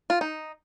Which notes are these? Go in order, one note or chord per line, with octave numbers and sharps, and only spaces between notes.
F4
D#4